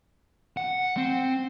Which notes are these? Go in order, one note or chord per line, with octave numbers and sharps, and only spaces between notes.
F#5
C4